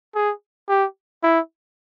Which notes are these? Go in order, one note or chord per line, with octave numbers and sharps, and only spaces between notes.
G#4
G4
E4